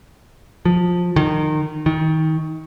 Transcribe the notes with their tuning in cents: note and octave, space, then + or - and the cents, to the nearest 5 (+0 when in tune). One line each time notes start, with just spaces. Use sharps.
F3 +20
D#3 -25
D#3 +25